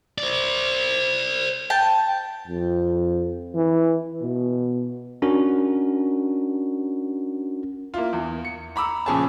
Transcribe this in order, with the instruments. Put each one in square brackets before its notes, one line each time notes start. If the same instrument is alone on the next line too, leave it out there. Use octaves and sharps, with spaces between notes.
[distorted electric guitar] C5 D5
[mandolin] G5 A5
[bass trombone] F2
E3
B2
[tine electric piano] C#4 D4 F#4 A#4
[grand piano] A#3 E4 F4
E2
C#7
A#5 B5 D6 E6
A#2 C#3 F3 G#4 C#5 A5